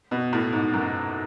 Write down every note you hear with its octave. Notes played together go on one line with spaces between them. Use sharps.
B2
A2
G#2
F#2